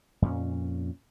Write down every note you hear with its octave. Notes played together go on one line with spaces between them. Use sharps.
F2 A#2 C#4